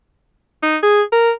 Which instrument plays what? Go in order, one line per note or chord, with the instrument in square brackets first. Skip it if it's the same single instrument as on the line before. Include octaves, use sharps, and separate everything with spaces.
[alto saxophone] D#4
G#4
A#4